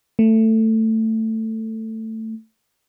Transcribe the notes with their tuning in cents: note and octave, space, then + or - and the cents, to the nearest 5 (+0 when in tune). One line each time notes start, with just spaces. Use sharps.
A3 +15